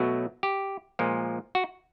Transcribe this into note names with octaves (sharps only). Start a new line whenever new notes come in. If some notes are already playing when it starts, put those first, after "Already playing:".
Already playing: B2 F#3 A3
G4
A#2 F3 G#3
F#4